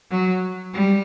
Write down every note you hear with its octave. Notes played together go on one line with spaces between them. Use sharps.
F#3
G3